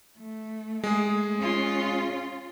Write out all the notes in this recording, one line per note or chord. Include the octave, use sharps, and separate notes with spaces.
A3
G#3 G#4
C#4 F4